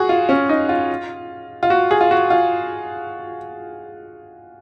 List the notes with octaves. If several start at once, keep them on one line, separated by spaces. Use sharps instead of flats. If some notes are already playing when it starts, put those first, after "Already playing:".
Already playing: F#4 G#4
F4
C#4
D#4
F4
F4
F#4
G#4
F4
F#4
F4